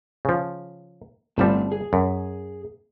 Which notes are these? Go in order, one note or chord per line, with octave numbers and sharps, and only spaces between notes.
C#3 F3
G1 A2 F3 G3 C4 A5
G#4
F#2